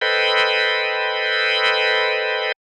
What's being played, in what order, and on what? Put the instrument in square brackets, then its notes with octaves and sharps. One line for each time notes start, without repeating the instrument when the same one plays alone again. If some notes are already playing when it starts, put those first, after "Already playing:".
[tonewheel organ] A4 B4 C5 D#5 G5 B5